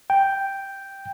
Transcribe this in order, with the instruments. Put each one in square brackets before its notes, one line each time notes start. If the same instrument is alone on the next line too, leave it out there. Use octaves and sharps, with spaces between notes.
[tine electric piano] G5